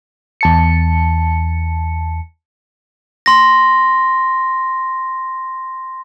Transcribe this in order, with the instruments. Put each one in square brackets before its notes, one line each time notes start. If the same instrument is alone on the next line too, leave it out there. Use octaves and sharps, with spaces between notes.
[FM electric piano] E2 A5 C#7
[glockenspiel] C6 A#6